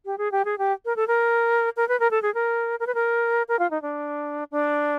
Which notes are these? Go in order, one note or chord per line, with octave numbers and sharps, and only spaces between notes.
G4
G#4
G4
G#4
G4
A#4
A4
A#4
A#4
B4
A#4
A4
G#4
A#4
A#4
B4
A#4
A#4
F4
D#4
D4
D4